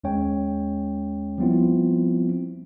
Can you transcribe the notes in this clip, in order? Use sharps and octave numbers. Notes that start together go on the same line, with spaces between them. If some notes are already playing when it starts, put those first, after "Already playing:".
D#2 G#3 C#4 C#5 G5
F3 G3 B3 C4 E4 F4